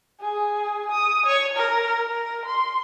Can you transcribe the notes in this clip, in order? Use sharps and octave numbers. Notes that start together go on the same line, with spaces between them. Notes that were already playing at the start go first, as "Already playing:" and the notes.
G#4
D#6
C#5
A#4
A#4
C6